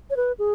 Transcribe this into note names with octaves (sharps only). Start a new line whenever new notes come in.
C#5
B4
G#4